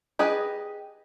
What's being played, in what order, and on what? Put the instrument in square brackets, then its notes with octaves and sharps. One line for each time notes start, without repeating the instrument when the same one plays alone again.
[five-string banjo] G4 G#4 B4 D#5